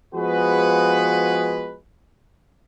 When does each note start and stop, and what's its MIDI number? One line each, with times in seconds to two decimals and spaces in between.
0.14 1.75 53
0.14 1.75 56
0.14 1.75 59
0.14 1.75 66
0.14 1.75 68
0.14 1.75 71